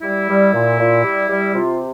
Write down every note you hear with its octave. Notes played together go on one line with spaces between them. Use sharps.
G3 E4
G3
A#2
A#2
G3
G3
C3 F4